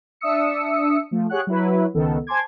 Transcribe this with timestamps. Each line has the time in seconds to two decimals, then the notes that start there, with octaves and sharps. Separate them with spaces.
0.21 D4 E5 D#6 E6 C#7
1.11 F3 A3
1.29 G4 G#4 C#5 F#5 F#6
1.47 F#3 E4 B4
1.94 C#2 D#3 B3 A4
2.27 C5 G#5 A5 C6 D6 G#6